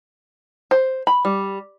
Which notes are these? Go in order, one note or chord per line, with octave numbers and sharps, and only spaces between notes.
C5
B5
G3